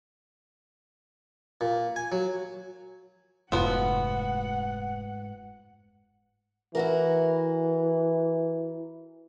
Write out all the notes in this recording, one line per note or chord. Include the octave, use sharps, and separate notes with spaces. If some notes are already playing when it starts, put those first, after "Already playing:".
A#2
G#5
F#3
F1 G#2 F3 A3 B3 F#4 F#5
E3 E4 F#4 A#4